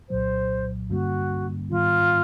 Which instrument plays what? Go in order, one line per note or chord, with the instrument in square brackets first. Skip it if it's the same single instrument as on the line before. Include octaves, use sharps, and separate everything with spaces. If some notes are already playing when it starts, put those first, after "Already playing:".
[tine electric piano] C2 A#2 F#3 [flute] C5
[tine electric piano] G2 D3 G3 A#3 C#4 [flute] F#4
[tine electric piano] G#2 D#3 G3 B3 [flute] F4